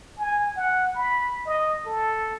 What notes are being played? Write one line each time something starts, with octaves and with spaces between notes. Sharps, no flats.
G#5
F#5
B5
D#5
A4